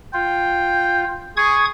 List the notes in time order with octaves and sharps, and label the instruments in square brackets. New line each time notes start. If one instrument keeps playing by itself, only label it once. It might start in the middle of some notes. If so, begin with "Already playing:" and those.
[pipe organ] F4 [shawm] G5
[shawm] G#4 [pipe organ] C#6 D#6 G#6